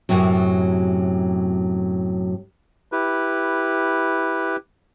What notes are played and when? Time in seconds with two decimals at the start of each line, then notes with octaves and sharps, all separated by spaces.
0.09 F#2 A2 C3 F#3
2.92 E4 G4 B4